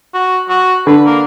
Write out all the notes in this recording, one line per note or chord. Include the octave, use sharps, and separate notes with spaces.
F#4
F#4
D3 B4
A#3